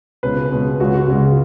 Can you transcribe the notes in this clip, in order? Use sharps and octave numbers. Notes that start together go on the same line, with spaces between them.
C#2 B2 G#3 C#4 B4
C#2 B2 G#3 C#4
C#2 C#3 G#3 F#4
F#4
C#2 C#3 G#3